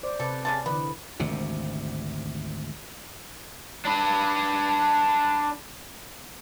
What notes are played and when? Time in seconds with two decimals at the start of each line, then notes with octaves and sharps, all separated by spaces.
0.03 C5 D5
0.20 C3 A4 B4
0.45 C#3 G#3 A5
0.66 D3 E3 B3
1.20 G#1 D2 C3
3.85 D4 B4